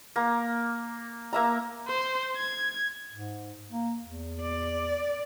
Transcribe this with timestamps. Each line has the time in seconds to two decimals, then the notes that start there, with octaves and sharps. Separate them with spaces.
0.16 A#3
1.33 A#3 E5 A#5
1.87 C5
2.36 G#6
3.13 G#2
3.71 A#3
4.04 E2
4.41 D5